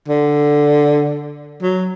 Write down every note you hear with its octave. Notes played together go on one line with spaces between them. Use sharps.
D3
F#3